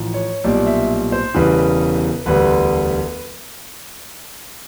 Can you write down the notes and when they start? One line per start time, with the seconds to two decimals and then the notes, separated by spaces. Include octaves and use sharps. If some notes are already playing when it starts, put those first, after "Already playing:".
Already playing: A1 A2 F3
0.14 C#5
0.44 B1 A#2 G3 D5
0.67 E5
1.12 C5
1.34 E1 E2 C#3 E3 G3 B4
2.25 E1 D2 D3 G3 B4